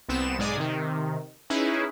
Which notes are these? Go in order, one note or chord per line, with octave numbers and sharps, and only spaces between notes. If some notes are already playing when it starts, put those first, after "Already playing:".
C2 B3 C4 E7
B1 G#2 G#3 D5 G#5 D#6
C3 D#3
C#4 D#4 E4 G#4 B4